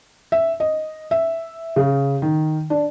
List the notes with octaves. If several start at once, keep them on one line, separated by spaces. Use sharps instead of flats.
E5
D#5
E5
C#3
D#3
D4